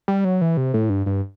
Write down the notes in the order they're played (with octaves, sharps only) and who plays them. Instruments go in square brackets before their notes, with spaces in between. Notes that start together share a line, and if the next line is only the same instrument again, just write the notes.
[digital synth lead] G3
F#3
E3
C3
A2
G2
G2